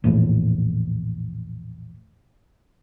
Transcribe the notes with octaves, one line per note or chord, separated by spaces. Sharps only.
A#1 E2 A2